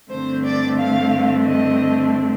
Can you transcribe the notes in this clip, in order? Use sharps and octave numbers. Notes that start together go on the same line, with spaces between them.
G2 D3 A3 C4 C5
D5
F5
D#5